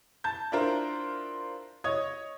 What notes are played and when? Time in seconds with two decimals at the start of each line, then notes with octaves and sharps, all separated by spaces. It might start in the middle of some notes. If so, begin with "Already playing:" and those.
0.24 A5 G6
0.52 D4 E4 F4 A#4 C5
1.84 C#5 D#5 D#6 G#6